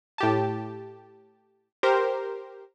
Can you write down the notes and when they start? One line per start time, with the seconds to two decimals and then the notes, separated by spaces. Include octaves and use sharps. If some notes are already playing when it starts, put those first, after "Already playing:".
0.18 A2 G4 A5
1.83 G4 A#4 C5